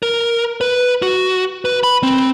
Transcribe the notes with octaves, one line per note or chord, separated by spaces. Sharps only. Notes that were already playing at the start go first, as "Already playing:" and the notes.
A#4
B4
F#4
B4
B5
C4